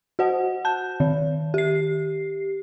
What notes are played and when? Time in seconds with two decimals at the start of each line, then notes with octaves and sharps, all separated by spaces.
0.19 F#4 C5 F#5
0.65 A5 G6
1.00 D#3
1.54 G4 C7